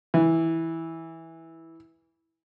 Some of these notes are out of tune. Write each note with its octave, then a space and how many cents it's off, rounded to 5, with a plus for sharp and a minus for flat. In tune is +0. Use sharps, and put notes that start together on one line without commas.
E3 -10